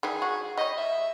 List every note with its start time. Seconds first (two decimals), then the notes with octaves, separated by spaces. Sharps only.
0.03 D#3 E3 G3 G#4
0.22 F#4
0.58 G3 C#5 D#5
0.77 E5